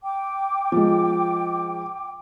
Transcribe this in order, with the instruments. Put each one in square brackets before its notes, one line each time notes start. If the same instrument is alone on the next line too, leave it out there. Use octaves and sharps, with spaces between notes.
[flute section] G5 D6
[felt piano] F3 G#3